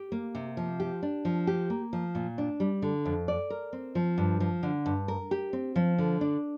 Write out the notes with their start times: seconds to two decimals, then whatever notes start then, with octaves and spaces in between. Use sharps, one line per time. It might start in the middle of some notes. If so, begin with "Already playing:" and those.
Already playing: G4
0.12 A#3
0.35 C3
0.57 F3
0.80 G4
1.03 D4
1.25 F3
1.47 G4
1.70 A#3
1.93 F3
2.15 A#2
2.38 D4
2.60 G3
2.82 D3
3.05 F2
3.28 D5
3.50 A#4
3.73 C4
3.95 F3
4.18 G2
4.40 F3
4.63 D3
4.86 G2
5.08 A#4
5.31 G4
5.53 C4
5.76 F3
5.98 D3
6.21 D4